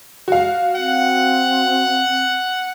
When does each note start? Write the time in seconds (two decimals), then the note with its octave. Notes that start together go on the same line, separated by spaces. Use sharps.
0.28 F#4 F5
0.76 C4 F#5